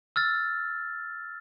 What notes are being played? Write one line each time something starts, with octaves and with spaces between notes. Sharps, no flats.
E6 F6 A6